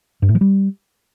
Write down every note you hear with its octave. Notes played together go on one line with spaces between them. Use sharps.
G2
A2
F3
G3